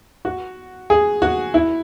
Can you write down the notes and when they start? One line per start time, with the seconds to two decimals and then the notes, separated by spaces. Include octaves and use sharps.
0.25 F#4
0.90 G#4
1.22 F#4
1.54 E4